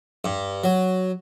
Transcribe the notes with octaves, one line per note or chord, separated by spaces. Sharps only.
G2
F#3